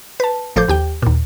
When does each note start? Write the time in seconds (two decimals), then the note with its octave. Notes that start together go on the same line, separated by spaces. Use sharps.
0.20 B4 A5
0.56 A1 F3 A4 C5 D6 G6
0.68 D#2 G4 G5
1.02 D#2 A#2